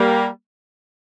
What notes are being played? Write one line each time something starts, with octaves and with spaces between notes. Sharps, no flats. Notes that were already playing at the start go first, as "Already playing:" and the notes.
Already playing: G3 A#3